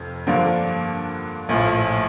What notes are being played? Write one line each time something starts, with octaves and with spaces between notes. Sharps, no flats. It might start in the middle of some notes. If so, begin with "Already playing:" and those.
Already playing: F1 F2
G2 D3 F3 A#3 D4
A#1 A2 F3